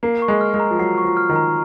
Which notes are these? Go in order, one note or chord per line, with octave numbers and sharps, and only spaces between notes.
A#3 C7
C#6
G#3
F6
G#3
A#5
F3
F#3 C7
C#6
F3
F6
D#3
A#5